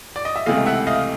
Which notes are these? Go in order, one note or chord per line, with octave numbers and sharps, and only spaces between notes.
D5
D#5
E5
C#2 C3 E3 A3 D#5 F5
E5 F#5
D#5 F5